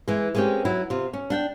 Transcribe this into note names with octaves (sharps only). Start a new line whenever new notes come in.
E3 G#3
G#3 A#3 C4 C#4 G4
F#3 E4
C3 F4
C#4
D4 F#5 G5